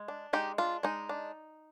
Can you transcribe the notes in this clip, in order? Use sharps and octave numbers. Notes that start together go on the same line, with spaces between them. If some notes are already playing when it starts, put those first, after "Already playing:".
Already playing: G#3
D4
G#3 D#4 G4
D4 F4
G#3 D#4
D4